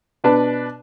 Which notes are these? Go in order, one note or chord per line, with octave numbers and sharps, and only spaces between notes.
B2 D4 B4 A5